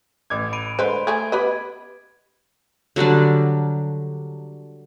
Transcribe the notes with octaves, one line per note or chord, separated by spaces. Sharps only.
A1 D6 G#6
B5 D7 D#7
D3 G#3 B4 C5
A3 G#4 G#6
B3 G4 B4 D#5 B5
D3 F#3 G3 D4